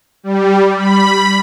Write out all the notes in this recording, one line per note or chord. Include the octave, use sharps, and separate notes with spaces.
G3
B5